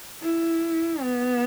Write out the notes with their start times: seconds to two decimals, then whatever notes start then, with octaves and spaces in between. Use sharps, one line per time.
0.22 E4
1.03 B3